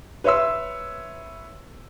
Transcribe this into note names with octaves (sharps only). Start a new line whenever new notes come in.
B4 C#5 E5 C6 E6